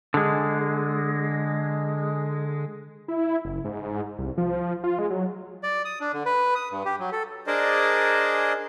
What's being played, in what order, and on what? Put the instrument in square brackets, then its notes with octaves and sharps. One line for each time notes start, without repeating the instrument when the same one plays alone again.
[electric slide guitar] D3 G#3
[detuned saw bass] E4
F#1
G#2
C2
F3
F4
G#3
F#3
[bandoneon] D5
D#6
D4
D3
B4
D#6
G2
G4
F#3
A4
[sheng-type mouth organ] D4 G#4 A#4 C5 D5 D#5